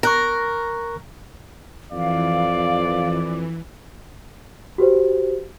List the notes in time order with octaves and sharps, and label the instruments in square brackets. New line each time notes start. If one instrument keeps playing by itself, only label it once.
[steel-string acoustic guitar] A#4 [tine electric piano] C#6 F#6 A#6
[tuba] F2 [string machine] E3 [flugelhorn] D5 [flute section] F5
[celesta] F#4 G4 B4 C5